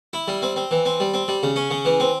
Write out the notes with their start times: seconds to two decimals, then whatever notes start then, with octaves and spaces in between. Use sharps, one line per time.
0.13 E4
0.28 G3
0.42 C4
0.56 C4
0.71 E3
0.85 C4
1.00 G3
1.14 C4
1.28 G3
1.43 C#3
1.56 C#4
1.71 C#3
1.85 E3
2.00 C4